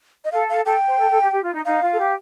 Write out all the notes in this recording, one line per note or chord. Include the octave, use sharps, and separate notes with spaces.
D#5
A4 F5
F5
A4 G5
C5
A4
A4
G4
G4
F4
D#4
D#4 F5
F4
A4
G4